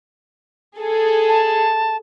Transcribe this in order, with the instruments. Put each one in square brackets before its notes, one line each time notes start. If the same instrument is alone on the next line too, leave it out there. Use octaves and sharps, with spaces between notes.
[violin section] G#4 A4
[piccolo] A5